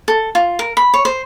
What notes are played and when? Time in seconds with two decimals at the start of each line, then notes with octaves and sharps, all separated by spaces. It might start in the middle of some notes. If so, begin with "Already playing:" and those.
0.08 A4
0.35 F4
0.59 A#4
0.77 B5
0.94 C#5
1.05 C5